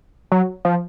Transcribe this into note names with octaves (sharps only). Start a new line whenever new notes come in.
F#3
F3